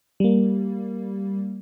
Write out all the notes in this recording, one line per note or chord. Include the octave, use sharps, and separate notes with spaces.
G3 A#3